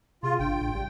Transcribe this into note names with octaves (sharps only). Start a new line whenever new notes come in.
C3 F4 G#4
G1 D4 G5
A1
G3